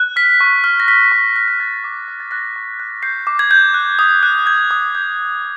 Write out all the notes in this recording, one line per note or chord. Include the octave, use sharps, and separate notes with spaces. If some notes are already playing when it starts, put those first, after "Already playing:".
Already playing: F#6
F6 B6
C#6
F6
A#6
F6 B6
C#6
F6 B6
A#6
F6 A6
D6
F6
A6
F#6 A#6
C#6
F#6
G6 C7
D6
G#6
G6
F#6
D#6
F#6
G6 G#6
D#6
G6
G6
D6